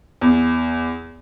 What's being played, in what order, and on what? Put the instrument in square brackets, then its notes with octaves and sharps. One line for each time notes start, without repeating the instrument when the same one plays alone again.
[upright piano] E2